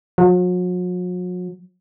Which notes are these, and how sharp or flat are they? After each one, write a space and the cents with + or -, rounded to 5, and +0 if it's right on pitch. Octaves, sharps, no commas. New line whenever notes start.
F#3 -45